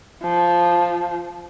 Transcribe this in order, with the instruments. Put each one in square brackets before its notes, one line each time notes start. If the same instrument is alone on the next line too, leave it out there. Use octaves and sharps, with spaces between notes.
[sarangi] F3